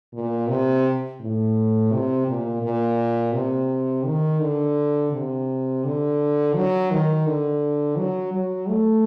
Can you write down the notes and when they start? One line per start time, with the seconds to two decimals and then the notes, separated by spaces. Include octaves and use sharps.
0.13 A#2
0.49 C3
1.20 A2
1.91 C3
2.27 A#2
2.62 A#2
3.34 C3
4.05 D#3
4.40 D3
5.13 C3
5.84 D3
6.55 F#3
6.91 D#3
7.27 D3
7.97 F#3
8.34 F#3
8.69 A3